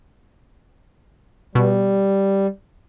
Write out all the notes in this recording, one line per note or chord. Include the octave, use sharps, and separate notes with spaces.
B2 G3